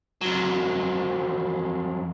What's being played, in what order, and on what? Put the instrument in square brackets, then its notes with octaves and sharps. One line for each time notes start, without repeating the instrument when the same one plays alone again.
[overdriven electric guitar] F2 F#3